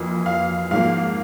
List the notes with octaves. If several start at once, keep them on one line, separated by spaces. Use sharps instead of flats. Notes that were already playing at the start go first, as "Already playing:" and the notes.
Already playing: F2 E3 A#3
F5
G#2 F3 A#3 F5